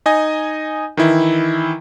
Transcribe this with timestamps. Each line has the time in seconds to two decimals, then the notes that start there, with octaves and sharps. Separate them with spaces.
0.06 D#4 D#5 G#5
0.97 D#3 E3 E4